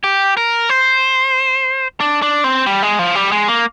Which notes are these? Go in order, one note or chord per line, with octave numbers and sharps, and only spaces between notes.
G4
A#4
C5
D4
D4
C4
G3
G#3
F3
G3
G#3
A#3